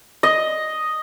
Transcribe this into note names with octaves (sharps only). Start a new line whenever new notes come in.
D#5